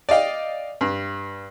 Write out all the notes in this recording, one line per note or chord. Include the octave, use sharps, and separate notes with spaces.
D5 D#5 F5 G5
G2